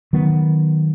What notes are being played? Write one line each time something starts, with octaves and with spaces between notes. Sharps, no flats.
D#3 F#3 B3